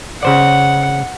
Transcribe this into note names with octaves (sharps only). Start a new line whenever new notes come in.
C#3 C5 D5 F#5